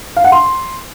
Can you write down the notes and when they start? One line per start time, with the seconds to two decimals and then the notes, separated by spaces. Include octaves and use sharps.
0.17 F5
0.24 F#5
0.32 C6